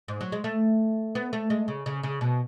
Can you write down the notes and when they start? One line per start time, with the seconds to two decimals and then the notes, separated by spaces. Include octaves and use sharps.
0.08 G#2
0.21 F#3
0.32 G#3
0.44 A3
1.15 B3
1.33 A3
1.50 G#3
1.68 C#3
1.86 C#3
2.03 C#3
2.21 B2